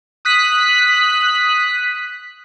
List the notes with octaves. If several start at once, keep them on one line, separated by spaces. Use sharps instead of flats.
D#6 F#6 B6